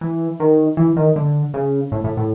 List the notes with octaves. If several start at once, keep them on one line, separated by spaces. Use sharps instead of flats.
E3
D#3
E3
D#3
D3
C#3
A2
A2
A2